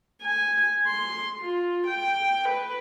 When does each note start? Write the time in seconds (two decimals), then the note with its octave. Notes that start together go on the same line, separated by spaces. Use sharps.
0.22 G#5
0.87 C6
1.41 F4
1.87 G5
2.49 B4